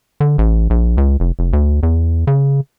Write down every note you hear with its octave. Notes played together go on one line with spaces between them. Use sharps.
D3
A1
A#1
C#2
F1
F1
D2
E2
C#3